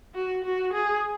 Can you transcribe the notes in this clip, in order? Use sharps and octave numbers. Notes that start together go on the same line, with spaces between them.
F#4
F#4
G#4